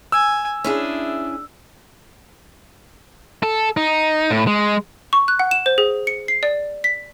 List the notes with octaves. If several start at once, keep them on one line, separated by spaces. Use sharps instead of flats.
G#5 E6
C#4 D4 E4 G#4
A4
D#4
A2
G#3
C#6
F#6
F#5
E7
C5
G#4
C#7
C7
D5
B6